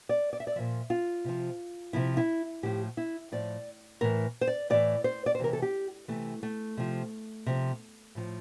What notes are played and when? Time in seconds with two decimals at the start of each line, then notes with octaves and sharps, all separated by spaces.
0.09 D5
0.33 D5
0.40 E5
0.47 D5
0.56 A#2 F3 E5
0.90 F4
1.25 C3 F3
1.93 C3 F3 E4
2.17 E4
2.63 A2 F3 G4
2.97 E4
3.32 A2 F3 D5
4.01 A2 E3 A#4
4.41 C5
4.47 D5
4.70 A2 E3 D5
5.04 C5
5.26 D5
5.35 C5
5.39 C3 E3 A#4
5.53 A4
5.62 G4
6.08 C3 E3 A3
6.43 A3
6.77 C3 F3
7.46 C3 F3
8.15 A2 F3